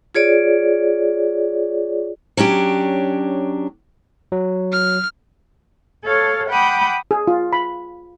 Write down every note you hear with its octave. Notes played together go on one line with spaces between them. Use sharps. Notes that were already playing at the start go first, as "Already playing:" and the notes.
F4 G#4 C#5 D5
F#3 C#4 D4 G4
F#3
F6
A4 C#5 F5
F#5 G5 B5 D6 D#6
G#4
F4
B5